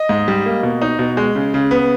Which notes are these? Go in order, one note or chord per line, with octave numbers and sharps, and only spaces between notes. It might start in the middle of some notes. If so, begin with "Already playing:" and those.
Already playing: D#5
G#2
G3
A#3
B2
D#4
B2
G#3
C#3
C#3
B3